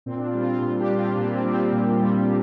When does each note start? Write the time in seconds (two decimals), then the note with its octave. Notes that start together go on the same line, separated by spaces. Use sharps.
0.06 A#2 C4
0.18 D4
0.24 C4 F4
0.33 G3
0.42 C4 F4
0.61 A#2 C4 F4
0.80 D4 G4
0.90 G3
0.98 C4 F4
1.17 A#2 A#3 D4
1.35 C4
1.45 G3
1.53 C4
1.72 A#2
2.01 G3